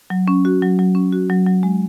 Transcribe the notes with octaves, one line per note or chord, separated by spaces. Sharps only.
F#3
C#4
F#4
F#3
F#3
C#4
F#4
F#3
F#3
G#3